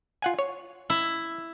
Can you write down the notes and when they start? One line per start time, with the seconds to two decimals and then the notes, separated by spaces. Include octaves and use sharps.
0.22 F4 F#5 G#5
0.39 C#5
0.90 E4